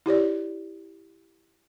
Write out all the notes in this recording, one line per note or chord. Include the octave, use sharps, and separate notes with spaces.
E4 G4 C#5 D5